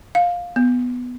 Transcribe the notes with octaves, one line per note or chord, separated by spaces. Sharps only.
F5
B3